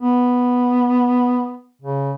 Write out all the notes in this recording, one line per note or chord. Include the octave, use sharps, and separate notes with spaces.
B3
C#3